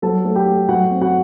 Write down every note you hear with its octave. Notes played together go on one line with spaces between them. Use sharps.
F#3 A4 A5
A3
G4 G5
A3
F#3 F#4 F#5
C4
F#4 F#5